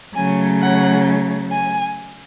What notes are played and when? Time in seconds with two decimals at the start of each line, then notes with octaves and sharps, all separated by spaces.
0.16 C#3 F#3 A3 G#5
0.62 F#5
1.51 G#5